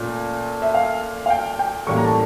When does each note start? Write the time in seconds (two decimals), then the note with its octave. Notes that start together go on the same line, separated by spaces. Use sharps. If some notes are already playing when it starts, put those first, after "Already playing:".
Already playing: A#2 A3 C#4 F4
0.62 E5
0.74 F5
1.26 F5
1.30 G5
1.59 G5
1.87 A2 E3 G3 A#3 C#4 C#6
1.96 A#5
2.05 A5